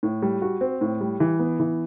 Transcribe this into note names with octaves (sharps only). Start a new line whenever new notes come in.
A2
G3
F#4
C4
A2
G3
E3
B3
E3